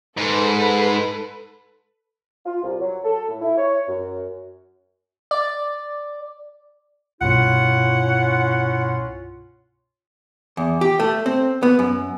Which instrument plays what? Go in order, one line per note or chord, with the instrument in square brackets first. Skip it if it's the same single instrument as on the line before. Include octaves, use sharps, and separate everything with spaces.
[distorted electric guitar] G#2 [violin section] A4 B4
[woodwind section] F4
C2
F#3
A4
A2
E4
C#5
F#2
[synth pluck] D5
[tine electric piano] C2 G2 B2 [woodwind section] C#4 E4 F4 [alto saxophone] F#5
[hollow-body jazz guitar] E2
G4
A3
C4
B3
F#2